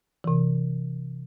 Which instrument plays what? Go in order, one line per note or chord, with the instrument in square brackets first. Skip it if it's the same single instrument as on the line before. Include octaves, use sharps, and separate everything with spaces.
[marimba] C3 E3